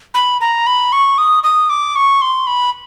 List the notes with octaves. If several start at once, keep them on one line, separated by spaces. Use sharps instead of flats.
B5
A#5
B5
C#6
D#6
D#6
D6
C#6
C6
B5